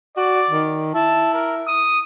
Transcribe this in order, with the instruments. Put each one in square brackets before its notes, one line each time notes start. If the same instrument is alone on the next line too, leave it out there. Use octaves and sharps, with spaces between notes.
[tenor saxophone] F#4 [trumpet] D5
[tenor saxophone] D#3
[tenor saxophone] E4 [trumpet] A5
[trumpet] A#4
D#6